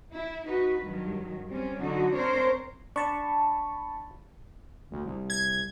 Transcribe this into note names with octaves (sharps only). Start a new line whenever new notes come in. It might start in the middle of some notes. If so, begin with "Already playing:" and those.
E4
D#4 F#4 B4
G2 D#3 F#3
G3 C4 C#4
D3 F#3 D#4 F#4
C4 D4 A#4 C5 C#5
D4 A5 B5 C#6
D2
C2
G#6